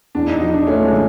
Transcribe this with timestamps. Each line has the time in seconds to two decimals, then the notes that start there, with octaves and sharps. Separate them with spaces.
0.15 E2 D4
0.28 D#4
0.41 F3 D#4
0.53 D4
0.67 A3 C#4
0.84 G#3
0.93 C#3